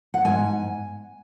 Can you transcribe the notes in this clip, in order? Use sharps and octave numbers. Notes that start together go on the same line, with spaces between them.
F#5
G#2 G#5